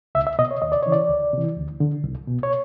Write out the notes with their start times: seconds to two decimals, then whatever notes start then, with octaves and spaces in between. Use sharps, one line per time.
0.15 C#2 E5
0.27 E5
0.39 B2 D#5
0.51 C#5
0.62 D#2 D#5
0.72 D5
0.83 C#3 E3 C#5
0.92 D5
1.09 D2
1.33 C3 E3
1.57 D2
1.80 D3
2.04 C2
2.28 B2
2.43 C#5